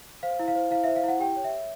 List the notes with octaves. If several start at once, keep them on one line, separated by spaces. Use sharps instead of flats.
C5 F5
E4
F5
C5
E4 F5
C5 E5
F5
E4 F#5
G4 G5
C#5
E5
C#5